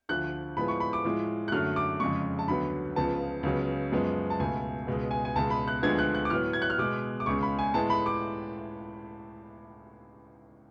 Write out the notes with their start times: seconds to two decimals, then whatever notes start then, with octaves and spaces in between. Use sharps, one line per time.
0.09 D2 D3 F3 F#6
0.57 A2 F3 G#3 B3 B5
0.68 C#6
0.80 B5
0.93 D6
1.04 A2 F3 G#3
1.48 F#6
1.52 F#2 D3 F#3 A3 F6
1.76 D6
2.00 F2 C#3 G#3 C#6
2.39 A5
2.48 D2 D3 F#3 B3 B5
2.96 C#2 C#3 F3 B3 A5
3.43 C#2 C#3 F#3 B3
3.92 F#2 F3 G#3 B3
4.30 A5
4.39 C#2 B2 A3 G#5
4.87 C#2 B2 G#3 B3
5.11 G#5
5.25 G#5
5.36 C#2 B2 G#3 A5
5.50 B5
5.68 F#6
5.83 D2 D3 F3 G#3 B3 G#6
5.99 F#6
6.15 F#6
6.25 D6
6.30 A2 F#3 B3 F6
6.53 G#6
6.62 F#6
6.70 F6
6.78 B2 G#3 B3 D6
7.20 D6
7.26 C#2 C#3 G#3 C#6
7.43 B5
7.59 G#5
7.74 A2 G#3 B3 A5
7.90 B5
8.06 D6